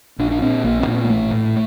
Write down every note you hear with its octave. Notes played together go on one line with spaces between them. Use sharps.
A#1 D4
D4
A#2 C4
A#1 A#3
C4
A#2 D4
C4
A#3
A1 A3
A2